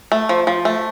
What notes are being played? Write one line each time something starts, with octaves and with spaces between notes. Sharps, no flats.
A3
F3
F3
A3